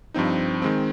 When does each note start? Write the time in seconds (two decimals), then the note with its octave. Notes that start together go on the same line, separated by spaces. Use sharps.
0.14 G2 F3 C4 D#4
0.62 D#3 G#3 C4